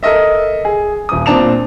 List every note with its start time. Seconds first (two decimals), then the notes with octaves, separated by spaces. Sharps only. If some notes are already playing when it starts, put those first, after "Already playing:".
0.03 A4 A#4 D#5 E5
0.65 G#4
1.09 D#1 D#6
1.26 A#2 C4 D4 A5 E7 F7